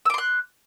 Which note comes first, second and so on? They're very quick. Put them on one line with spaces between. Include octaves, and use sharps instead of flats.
E6 D6 C6 F#6